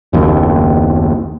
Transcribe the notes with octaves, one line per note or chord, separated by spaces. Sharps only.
F#1 D#2